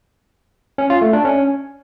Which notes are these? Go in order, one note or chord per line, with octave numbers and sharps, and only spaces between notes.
C#4
F4
A3
D4
C#4